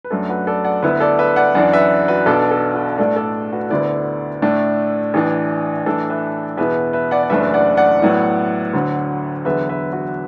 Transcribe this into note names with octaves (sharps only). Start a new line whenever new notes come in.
B4
F#2 F#3 A3 D4 A4
F#4 B4
A4 D5
D5 F#5
D2 D3 B3 E4 B4 E5
A4 D5
B4 E5
D5 F#5
F#2 E3 D4 D5 F#5
B4 E5
F#4 B4
B1 B2 B3 D4 A4 D5
A4
F#4 B4
A2 A3 D4 A4 D5
A4 D5
F#4 B4
D2 D3 B3 E4 A4 D5
A2 A3 D4
A1 A2 E3 D4
A2 E3 D4 A4 D5
B4 E5
E2 B2 B3 E4 B4 E5
B4 E5
D5 F#5
D5
F#1 F#2 E3 A3 D4 B4 E5
D5 F#5
D5 F#5
A2 F#3 B3 E4
D2 D3 F#3
E2 D3 F#3 B3 B4 E5
B4 E5
F#4 B4